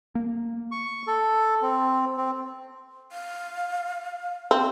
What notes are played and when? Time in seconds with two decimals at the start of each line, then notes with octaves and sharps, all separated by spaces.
0.15 A#3
0.71 C#6
1.07 A4
1.62 C4
2.17 C4
3.12 F5
4.51 C4